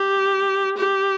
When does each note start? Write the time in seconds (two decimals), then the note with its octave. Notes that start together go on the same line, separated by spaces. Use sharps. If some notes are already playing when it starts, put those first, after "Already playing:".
Already playing: G4
0.77 G4